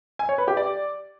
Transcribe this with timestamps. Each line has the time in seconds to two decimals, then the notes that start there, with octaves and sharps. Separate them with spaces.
0.19 G#5
0.29 C#5
0.38 B4
0.48 G4
0.57 D5